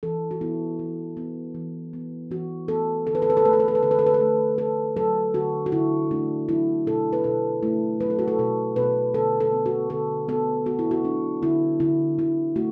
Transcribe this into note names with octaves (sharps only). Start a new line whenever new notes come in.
E3 A4
F#4
B3 E4
E3
B3
E3
B3
E3 F#4
B3 A4
D3 A4
B4
A4
B4
A4
A3 B4
A4
B4
A4
B4
D3 A4
B4
A4
B4
A4
A3
A3 A4
F#3 A4
D3 F#4
F#4
D3 E4
A3 D4
F#3 E4
B2 A4
B4
B2 A4
A3 E4
F#3 B4
A4
F#4
A4
B2 A4
B2 B4
D3 A4
A4
B3
F#4
D3 A4
B3 A4
B3 F#4
E4
F#4
F#3 D4
D3 E4
D3 E4
D3 E4
A3 F#4